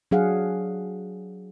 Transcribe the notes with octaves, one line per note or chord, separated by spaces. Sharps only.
F#3 D4 G#4 F5 F#5